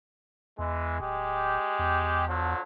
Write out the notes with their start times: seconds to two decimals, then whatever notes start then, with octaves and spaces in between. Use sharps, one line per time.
0.59 E2 E3 G#3
1.00 D1 G#3 G4
1.79 E2
2.28 D3 F3 F#3